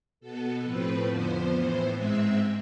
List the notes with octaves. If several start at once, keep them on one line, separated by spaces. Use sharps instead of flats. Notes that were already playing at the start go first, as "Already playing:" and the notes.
B2 B3 A4
A2 F3 A3 C4 B4
F2 D3 F3 B3 C5
A2 E3 B3
G#2 G#3 C4 E5